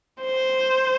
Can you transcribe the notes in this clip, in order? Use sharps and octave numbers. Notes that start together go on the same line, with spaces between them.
C5